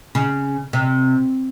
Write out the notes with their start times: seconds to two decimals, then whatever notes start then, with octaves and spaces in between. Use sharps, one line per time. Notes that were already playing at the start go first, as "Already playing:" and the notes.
0.15 C#3
0.73 C3